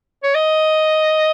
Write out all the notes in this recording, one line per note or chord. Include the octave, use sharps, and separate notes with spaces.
C#5
D#5